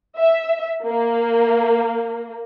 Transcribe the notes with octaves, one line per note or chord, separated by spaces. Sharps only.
E5
A#3